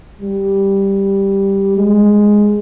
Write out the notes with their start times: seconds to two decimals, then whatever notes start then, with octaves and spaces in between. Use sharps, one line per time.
0.22 G3
1.77 G#3